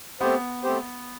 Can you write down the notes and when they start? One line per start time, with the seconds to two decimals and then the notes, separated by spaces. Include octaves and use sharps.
0.20 A3 B3 C4 G4 C5
0.63 A3 C4 G4 C5